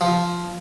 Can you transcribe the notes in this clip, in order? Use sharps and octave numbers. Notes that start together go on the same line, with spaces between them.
F3